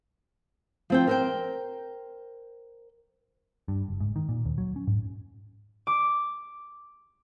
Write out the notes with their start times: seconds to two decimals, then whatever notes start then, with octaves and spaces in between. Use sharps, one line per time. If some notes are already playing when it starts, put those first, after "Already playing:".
0.90 F3 C4 G5
1.07 A#4 C5 G5
3.68 G2
3.88 F#1
4.00 G#2
4.16 D#3
4.29 A#2
4.45 D#2
4.58 F#3
4.76 C#4
4.87 G#2
5.87 D6